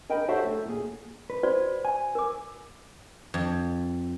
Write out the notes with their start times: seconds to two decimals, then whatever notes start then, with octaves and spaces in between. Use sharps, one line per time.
0.10 A#4 D#5 G5 B5
0.29 F#4 G4 A4 C5 C#5 E5
0.44 A3
0.65 A#2 G#4
1.30 B4
1.43 F#4 C5 D5
1.85 G#5
2.15 A#4 D6
3.34 F2